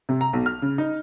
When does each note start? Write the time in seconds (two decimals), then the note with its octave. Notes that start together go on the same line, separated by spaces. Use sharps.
0.09 C3
0.21 A#5
0.33 B1
0.46 F6
0.62 C#3
0.78 D#4